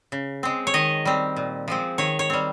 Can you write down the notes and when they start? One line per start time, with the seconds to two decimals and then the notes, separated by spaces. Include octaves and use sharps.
0.12 C#3
0.43 G#3 C4
0.67 C#5
0.74 D#3 D#5
1.05 G3 C4
1.36 A#2
1.68 F3 G#3 C4
1.98 D#3 C#5
2.19 C#5
2.30 G3 C4